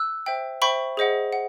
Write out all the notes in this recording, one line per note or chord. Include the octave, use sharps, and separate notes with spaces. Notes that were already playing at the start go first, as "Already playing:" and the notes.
Already playing: E6 F#6
C5 E5 G5
C5 E5 G5 B5 C#6
G#4 C5 D#5 F#5
F#5